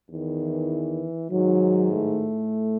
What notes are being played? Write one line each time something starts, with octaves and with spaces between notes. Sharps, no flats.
E2 D#3
E3
G#2 D#3 F#3
A2 A3